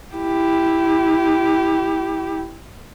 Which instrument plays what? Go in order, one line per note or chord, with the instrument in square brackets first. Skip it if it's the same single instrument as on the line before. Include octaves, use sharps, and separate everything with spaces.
[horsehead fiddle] E4 G4